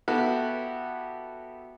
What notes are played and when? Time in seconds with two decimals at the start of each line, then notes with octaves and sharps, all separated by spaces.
0.08 B3 E4 F#4 G4 A4